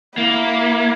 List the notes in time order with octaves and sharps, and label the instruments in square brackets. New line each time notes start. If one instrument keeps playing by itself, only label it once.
[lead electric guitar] A#3 [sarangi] E4